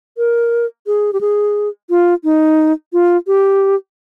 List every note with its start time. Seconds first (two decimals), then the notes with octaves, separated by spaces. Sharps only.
0.18 A#4
0.87 G#4
1.13 G4
1.21 G#4
1.90 F4
2.24 D#4
2.93 F4
3.27 G4